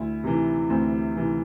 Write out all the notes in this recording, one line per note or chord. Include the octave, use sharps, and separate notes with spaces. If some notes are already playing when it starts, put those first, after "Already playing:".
Already playing: D2 E4
C3 E3
D2 C4
C3 E3